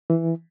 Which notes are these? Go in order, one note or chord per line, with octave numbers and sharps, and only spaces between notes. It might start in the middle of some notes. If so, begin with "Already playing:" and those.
E3